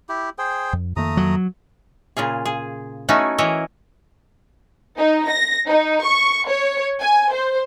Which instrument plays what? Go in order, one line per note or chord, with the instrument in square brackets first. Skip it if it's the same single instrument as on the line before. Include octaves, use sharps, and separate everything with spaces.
[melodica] E4 G4
G#4 C5 G5
[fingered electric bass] F2
[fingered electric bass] F2 D#3 A#3 [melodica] A3 A#5 D#6
[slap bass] F#3
[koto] A#2 C#3 F4 G#4
G#4
A3 B3 C#4 D#4 E4 F#4
E3 E4 A#4 C#5 D#5
[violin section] D#4
A#6
D#4
C#6
C#5
G#5
C5